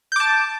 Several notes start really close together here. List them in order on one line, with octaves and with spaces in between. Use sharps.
G6 D6 A5